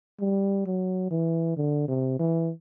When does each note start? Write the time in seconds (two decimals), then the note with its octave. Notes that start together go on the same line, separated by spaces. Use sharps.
0.20 G3
0.66 F#3
1.11 E3
1.57 D3
1.88 C3
2.19 E3